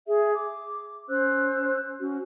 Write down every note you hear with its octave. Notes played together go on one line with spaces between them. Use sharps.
G#4 E5
D6
C#4 C5 E6 F#6
C#4 F#4